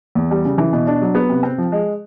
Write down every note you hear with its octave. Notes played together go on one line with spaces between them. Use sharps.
E2
G3
C#3
E3
B2
D4
F#3
B3
C3
C4
F3
G#3